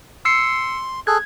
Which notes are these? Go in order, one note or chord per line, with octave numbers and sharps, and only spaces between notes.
C6 E6 C7 C#7
G#4 A4 F#6 G#6